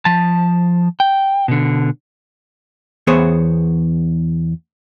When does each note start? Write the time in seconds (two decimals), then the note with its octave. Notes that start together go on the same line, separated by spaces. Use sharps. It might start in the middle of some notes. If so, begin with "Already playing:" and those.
0.05 F3 A5
1.00 G5
1.48 B2 D3
3.07 E2 B3 G#4 C5 C#5